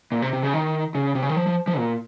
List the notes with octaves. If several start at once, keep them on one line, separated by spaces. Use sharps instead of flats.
A#2
C3
C3
C#3
D#3
C#3
C3
C#3
D#3
F3
F3
F3
A#2